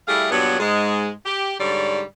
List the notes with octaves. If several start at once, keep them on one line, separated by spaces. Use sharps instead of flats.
G3 A3 E4 G#4 F5
G2 A#2 F#3 B3
G#2 G#3
G4
G#2 D3 G3 C#5 D5